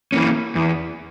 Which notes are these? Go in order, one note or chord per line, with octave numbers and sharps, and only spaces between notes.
E3 A#3 C#4
E2